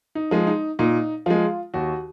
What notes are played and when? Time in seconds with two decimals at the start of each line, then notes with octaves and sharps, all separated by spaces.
0.15 D#4
0.31 F3 G#3
0.47 D#4
0.79 A#2 D#4
1.26 F3 G#3 F4
1.74 D#2 F#4